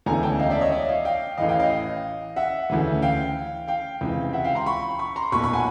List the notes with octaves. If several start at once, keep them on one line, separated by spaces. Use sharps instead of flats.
E1 D2 C#3 E3 G#5 A#5
G5 A5
D#5 F5
D5 E5
C#5 D#5
D5 E5
D#5 F5
F5 G5
A1 A2 E3 D#5 F5
F5 G5
D#5 F5
E5 F#5
D2 C#3 E3
F5 G5
F5 G5
C#2 C3 E3
E5 F#5
F5 G5
A#5 C6
B5 C#6
B5 C#6
A#5 C6
B1 A#2 B5 C#6
B5 C#6
F#5 G#5